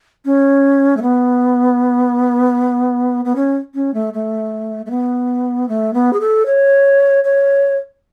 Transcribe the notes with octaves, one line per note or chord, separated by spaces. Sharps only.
C#4
A3
B3
B3
C#4
C#4
A3
A3
A3
B3
A3
B3
G#4
A4
C#5
C#5